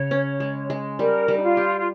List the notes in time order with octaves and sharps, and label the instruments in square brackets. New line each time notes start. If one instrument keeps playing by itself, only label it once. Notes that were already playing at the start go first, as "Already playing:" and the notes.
Already playing: [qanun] C#3 [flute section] C#5
[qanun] C#4
G#3
G#3
[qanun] G3 [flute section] A#4
[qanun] G3
[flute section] D#4
F4
[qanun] G4
[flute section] F4